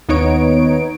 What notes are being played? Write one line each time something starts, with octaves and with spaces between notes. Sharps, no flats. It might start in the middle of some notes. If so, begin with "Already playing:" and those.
D#2 B3 D#4 C#5 D7